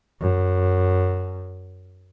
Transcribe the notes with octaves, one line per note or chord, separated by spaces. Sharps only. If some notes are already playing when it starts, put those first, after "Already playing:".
F#2